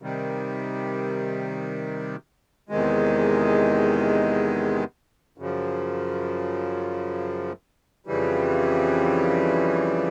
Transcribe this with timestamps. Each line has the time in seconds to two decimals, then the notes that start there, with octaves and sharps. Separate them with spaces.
0.02 C3 D#3 G3
2.69 E2 C3 D#3 G#3
5.38 F#2 C#3 F3
8.06 F2 C#3 E3 G3